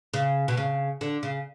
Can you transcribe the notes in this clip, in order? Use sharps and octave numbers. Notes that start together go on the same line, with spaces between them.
C#3
B2
C#3
D3
C#3